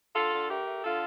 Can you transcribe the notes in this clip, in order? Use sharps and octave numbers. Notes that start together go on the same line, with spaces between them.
D3 F4 A4
D3
A3 G4 A#4
A3
D3 F4 A4